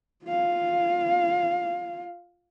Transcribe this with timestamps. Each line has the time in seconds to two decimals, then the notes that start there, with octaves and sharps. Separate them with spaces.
0.24 F4 F5